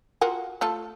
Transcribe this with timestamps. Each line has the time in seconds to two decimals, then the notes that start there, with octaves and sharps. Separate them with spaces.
0.21 F4 F#4 A#4
0.61 A3 F4 A4